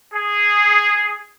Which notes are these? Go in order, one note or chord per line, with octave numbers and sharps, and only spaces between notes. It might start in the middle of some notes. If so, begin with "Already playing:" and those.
G#4